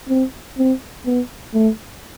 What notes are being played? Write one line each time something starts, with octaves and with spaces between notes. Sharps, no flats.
C4
C4
B3
A3